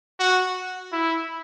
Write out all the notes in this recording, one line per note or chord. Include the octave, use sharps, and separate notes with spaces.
F#4
E4